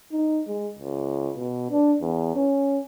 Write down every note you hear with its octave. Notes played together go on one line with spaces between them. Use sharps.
D#4
G#3
C#2
B2
D4
E2
C#4